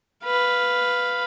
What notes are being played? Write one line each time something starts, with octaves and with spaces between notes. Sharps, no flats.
B4 F5